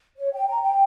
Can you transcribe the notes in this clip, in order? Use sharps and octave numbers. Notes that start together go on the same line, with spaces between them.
C#5
G5
A#5
G5